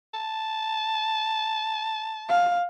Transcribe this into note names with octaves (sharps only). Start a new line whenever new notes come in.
A5
F5